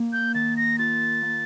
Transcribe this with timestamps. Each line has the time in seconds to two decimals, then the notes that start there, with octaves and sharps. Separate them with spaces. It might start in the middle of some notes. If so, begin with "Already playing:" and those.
Already playing: A#3
0.13 G6
0.34 D#3 A6
0.57 A#6
0.79 F4 A6
1.22 A#3